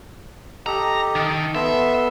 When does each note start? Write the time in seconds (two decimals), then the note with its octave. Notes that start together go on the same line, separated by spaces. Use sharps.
0.66 G4 A4 D#5 A#5
1.15 D#3
1.55 B3 A4 E5 C6